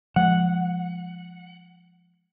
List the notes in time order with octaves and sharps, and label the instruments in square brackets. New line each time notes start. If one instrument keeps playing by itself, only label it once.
[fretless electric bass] F3 G#3 [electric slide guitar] F#5